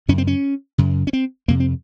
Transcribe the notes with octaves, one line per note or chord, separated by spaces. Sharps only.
F#2 C#3 C#4
C4
C#4
F#2 C#3
C#4
C4
F2 C3 A#3
C4